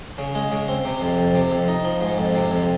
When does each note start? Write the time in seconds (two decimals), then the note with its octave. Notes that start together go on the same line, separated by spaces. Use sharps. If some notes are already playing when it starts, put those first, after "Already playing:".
0.18 C#3
0.35 G#3
0.52 C#3
0.68 C4
0.85 C3
1.01 F2
1.19 F2
1.35 C3
1.51 F2
1.68 D#4
1.85 F3
2.01 G#2
2.18 F2
2.35 C3
2.51 F2